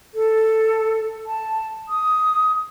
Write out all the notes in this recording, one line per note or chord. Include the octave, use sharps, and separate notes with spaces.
A4
A5
D#6